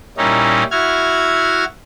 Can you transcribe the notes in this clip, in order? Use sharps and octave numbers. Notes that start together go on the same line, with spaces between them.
A#2 G3 C#4 D#4 E4
E4 F#4 F6 G#6